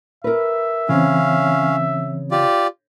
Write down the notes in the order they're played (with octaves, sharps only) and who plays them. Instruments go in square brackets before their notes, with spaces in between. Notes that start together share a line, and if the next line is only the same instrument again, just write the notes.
[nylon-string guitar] A#4 B4 [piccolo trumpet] E5
[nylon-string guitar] C#3 [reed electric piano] E3 C4 [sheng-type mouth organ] C#4 F5
[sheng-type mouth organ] F4 G4 D5